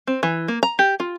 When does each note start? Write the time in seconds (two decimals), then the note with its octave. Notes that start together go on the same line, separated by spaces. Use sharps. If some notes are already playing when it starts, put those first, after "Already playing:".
0.07 C4
0.23 E3
0.48 A#3
0.63 A#5
0.79 G4
1.00 F4